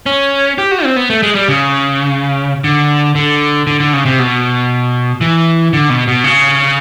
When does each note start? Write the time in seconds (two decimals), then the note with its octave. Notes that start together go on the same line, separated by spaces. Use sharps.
0.06 C#4
0.58 G4
0.71 F#4
0.84 C4
0.96 B3
1.10 A3
1.23 G#3
1.35 G3
1.48 C#3
2.64 D3
3.15 D3
3.67 D3
3.80 D3
3.93 C#3
4.05 C3
4.19 B2
5.21 E3
5.73 D3
5.90 B2
6.08 B2
6.24 C#3